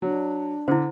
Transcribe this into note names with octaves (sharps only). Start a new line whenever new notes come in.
F#3 D4
D3 E4 C5